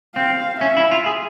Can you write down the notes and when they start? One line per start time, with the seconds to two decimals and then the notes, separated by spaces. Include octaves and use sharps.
0.16 C4 F5
0.61 C#4 E5
0.77 E4
0.91 F4
1.06 G#4